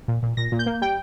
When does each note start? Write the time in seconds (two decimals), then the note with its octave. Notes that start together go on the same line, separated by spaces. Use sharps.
0.08 A#2
0.23 A#2
0.37 A#2 A#6
0.52 A#2
0.59 G6
0.66 A#3
0.81 G3 G5